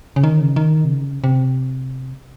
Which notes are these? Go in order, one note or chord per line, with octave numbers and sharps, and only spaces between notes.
C#3
D#3
C#3
D#3
C3
C#3
C3